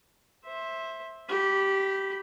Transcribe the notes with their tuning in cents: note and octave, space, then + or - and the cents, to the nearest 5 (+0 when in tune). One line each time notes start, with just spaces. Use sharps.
C5 +20 E5 -5
G4 -15 B5 +0